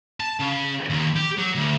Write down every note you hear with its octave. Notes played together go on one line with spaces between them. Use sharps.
A5
C#3
D#2
G4
F#3
D2